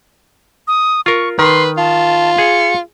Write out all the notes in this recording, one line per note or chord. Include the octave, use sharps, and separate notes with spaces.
D#6
F4 A#4 C#6
D#3 B4 C6
F4 A5
G#4 C#7